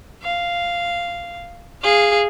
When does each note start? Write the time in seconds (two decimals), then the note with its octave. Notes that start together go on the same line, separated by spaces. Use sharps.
0.23 F5
1.82 G#4 F5